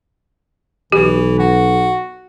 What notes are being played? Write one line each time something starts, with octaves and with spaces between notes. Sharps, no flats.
B1 E3 G4
F#4